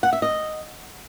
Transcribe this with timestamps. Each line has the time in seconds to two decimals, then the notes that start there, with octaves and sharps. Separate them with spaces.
0.03 F#5
0.13 E5
0.22 D#5